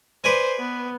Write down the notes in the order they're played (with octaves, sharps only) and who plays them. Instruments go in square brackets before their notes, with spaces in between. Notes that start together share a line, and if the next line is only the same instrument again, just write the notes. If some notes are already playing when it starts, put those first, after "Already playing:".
[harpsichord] B4 D5 G#5 [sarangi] C5
[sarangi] B3